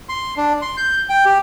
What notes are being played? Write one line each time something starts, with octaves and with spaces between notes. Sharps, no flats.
C6
D4
C6
G6
G5
G4